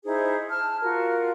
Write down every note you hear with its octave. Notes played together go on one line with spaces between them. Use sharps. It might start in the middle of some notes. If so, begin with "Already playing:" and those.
D#4 E4 G#4 C5
A5 F6
F4 F#4 A#4